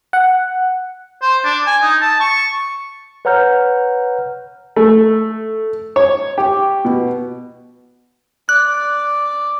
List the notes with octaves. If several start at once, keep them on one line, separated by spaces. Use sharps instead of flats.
F#5
C5
D4
G#5
D#4
A5
C#6
B4 C#5 F#5 A#5 F6 G6
A3
C#5
G4
B2
D5 F#6